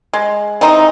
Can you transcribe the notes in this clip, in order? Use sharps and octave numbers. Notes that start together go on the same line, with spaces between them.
G#3
E3 C4 D#4 A#5